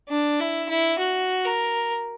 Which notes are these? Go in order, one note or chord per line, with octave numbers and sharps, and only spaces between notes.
D4
E4
E4
F#4
A#4